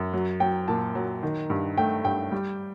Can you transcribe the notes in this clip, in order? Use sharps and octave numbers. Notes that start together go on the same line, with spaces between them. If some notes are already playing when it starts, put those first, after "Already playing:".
Already playing: F#2
F#3
F#3 G5
A#2 A5
F#3
D#3
G2
A3 G5
G2 G5
G3